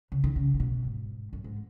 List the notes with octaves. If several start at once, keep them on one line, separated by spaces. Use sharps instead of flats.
C#3
D#3
C#3
C#3
B2
G#2
F#2
G#2